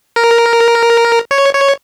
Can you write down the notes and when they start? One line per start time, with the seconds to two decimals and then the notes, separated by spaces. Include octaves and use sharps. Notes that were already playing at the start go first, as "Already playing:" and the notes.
0.16 A#4
1.31 C#5
1.54 C#5